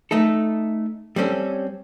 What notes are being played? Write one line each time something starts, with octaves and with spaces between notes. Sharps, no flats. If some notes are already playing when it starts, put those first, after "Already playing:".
A3 D#4 A4
G3 C4 C#4 A4